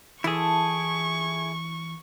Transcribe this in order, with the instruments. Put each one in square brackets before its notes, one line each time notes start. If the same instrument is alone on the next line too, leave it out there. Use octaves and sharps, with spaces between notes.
[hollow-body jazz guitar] E3 [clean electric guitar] E4 G#4 [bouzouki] F4 A4 A5 [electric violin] C#6